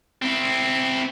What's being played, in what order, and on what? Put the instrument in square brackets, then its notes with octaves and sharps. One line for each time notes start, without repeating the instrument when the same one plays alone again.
[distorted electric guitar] C4 E4